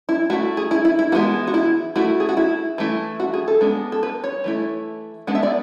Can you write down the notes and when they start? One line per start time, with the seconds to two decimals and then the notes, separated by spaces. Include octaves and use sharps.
0.09 E4
0.30 A3 F#4
0.33 E4
0.57 G#4
0.71 E4
0.85 E4
0.99 E4
1.12 E3 G#3 B3 E4 F#4
1.47 F#4
1.54 E4
1.96 A3 E4 F#4
2.20 G#4
2.29 F#4
2.37 E4
2.78 E3 A3 E4
3.20 F#4
3.34 G#4
3.48 A4
3.61 G#3 B3 D4
3.92 A4
4.03 B4
4.24 C#5
4.44 E3 A3 E4
5.27 G#3 B3 D4 F#5
5.35 E5
5.43 D5